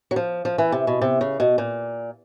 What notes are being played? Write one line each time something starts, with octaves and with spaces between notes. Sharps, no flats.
F#3
F3
F3
E3
C3
B2
C3
C#3
B2
A#2